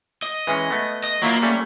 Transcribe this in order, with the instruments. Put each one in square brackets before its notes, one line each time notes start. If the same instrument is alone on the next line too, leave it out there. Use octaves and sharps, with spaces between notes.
[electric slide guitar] D#5
[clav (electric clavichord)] E3 G#3 C#4
A3 B3
[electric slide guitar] D#5
[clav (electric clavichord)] F#3 E4 F4 [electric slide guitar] A#3
[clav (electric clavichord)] G3 A3 C#4